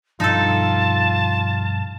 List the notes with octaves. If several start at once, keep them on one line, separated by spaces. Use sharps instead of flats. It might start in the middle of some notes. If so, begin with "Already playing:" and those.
G2 B2 F3 D#4 F4 A4 A5